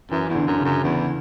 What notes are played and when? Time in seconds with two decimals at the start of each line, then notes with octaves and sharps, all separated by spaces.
0.11 F#2 E3
0.30 E2
0.35 D3
0.47 F#2
0.60 C#3
0.65 F#2
0.83 E2 E3